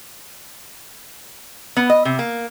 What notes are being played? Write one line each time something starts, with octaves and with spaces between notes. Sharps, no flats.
B3
D#5
C3
A#3